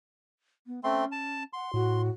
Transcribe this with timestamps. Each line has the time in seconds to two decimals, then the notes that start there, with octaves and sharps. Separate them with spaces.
0.67 B3
0.84 A3 C4 C#4 C6
1.12 A5
1.53 F#5 C6
1.74 A2 F#4